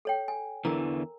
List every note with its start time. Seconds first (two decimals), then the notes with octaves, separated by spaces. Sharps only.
0.05 A4 C#5 G5
0.28 G#5
0.65 E2 D3 E3 A#4 A#5